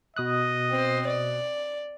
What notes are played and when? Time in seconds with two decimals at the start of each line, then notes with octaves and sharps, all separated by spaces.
0.17 B2 D#5 D#6 F#6
0.71 C4 C5
1.07 D5